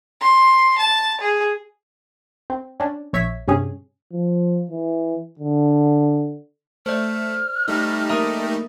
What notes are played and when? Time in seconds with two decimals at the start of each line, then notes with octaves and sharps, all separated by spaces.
0.21 C6
0.78 A5
1.21 G#4
2.50 C4
2.80 C#4 D4
3.13 A#1 C#5 E5 G#6 B6
3.48 G2 C3 C#4 G#4
4.13 F3
4.71 E3
5.39 D3
6.86 A3 C5 D5 F6
7.68 G3 A3 D#4
8.09 A#3 A#4 E5 A#5 D#6